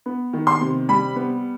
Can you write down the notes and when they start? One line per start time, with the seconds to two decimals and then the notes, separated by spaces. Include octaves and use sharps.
0.06 B3
0.33 D#3
0.47 C6
0.61 C3
0.89 G3 B5
1.16 B3